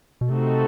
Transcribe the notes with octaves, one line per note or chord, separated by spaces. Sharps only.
B2
C3 A3 C4 D#4 F#4 A4